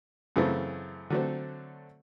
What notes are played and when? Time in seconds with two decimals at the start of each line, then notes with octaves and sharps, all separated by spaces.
0.36 F#2 C#3 E3 A3 C4
1.10 D3 F#3 A3 C4